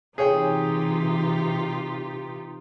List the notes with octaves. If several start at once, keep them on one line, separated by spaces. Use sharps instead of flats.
C3 E3 D#4 F4 G4 G#4 C#5 G5